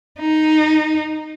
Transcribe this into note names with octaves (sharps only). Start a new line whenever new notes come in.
D#4